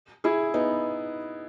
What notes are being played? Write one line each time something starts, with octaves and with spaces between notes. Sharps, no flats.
E4 G#4
B3 D#4